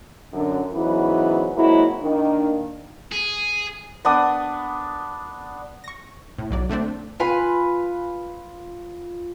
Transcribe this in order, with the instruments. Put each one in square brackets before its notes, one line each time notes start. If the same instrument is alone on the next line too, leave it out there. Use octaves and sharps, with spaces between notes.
[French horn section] F#2 D3
G#2 C#3 E3 F#3 B3 B4
F#3 G#3 A#3 C4 E4 F#4
D#3 A#3 D4
[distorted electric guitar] G#4
[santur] B3 D4 D#6
[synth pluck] C#6 A#6
A2
B1 F#3 D5
D3 A3 C4 D4
[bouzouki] F4 B4 G#5